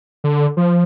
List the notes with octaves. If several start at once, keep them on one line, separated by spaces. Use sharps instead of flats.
D3
F3